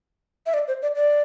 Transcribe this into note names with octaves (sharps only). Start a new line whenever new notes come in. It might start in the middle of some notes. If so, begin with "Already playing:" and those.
E5
D5
C5
D5
D5